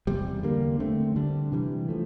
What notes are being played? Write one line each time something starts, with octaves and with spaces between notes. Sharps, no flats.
E2 C3 G3
D3 G3 A#3
D3 A3 C4
D3 G3 D4
C3 E3 G3
F3 A3